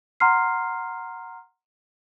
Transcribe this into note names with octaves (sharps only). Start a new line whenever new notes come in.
F#5 A#5 C6 F6 C7